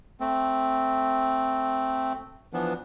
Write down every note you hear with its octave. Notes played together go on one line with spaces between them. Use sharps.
A3 C4
E3 F3 B3 D4